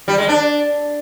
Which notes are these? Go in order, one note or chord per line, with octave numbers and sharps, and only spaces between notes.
G3
G#3
D4